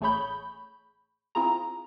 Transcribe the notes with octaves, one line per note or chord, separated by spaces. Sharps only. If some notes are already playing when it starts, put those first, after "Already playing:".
A1 A3 G#4 C#5 B5 G6
C4 E4 F4 G#4 A#5